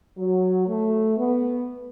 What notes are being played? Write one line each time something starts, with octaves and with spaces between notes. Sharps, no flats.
F#3
A3
B3